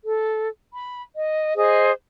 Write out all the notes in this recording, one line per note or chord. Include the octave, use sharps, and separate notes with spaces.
A4
B5
D#5
G#4 C5 D#5